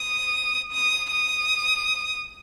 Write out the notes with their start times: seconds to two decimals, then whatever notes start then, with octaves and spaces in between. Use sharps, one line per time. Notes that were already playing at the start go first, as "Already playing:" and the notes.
Already playing: D#6
0.73 D#6
1.12 D#6